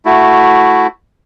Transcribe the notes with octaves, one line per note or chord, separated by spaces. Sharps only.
A3 E4 F#4